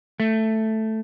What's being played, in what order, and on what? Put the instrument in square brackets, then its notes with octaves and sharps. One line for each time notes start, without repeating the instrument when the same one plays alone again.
[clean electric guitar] A3